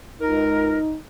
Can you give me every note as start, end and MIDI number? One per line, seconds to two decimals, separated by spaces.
0.21 0.78 37
0.21 0.96 63
0.21 0.78 70